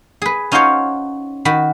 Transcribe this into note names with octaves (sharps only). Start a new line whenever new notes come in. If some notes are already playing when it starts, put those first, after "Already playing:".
G#4 B4
C#4 D#4 F4 F#4 C5 C#5
D#3 F#4 B5